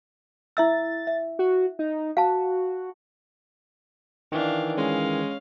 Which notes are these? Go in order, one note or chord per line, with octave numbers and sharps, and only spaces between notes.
E4 E5 E6 A6
E5
F#4
D#4
F#4 F5 A5
D#3 E3 D4 F5
G#3 C#4 F5